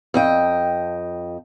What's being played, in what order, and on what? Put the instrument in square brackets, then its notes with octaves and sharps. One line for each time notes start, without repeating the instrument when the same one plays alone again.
[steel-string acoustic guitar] F2 D#5 G5